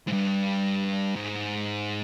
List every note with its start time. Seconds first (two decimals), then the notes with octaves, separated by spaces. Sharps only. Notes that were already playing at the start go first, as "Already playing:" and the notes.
0.07 G#2
0.13 G2
1.16 G#2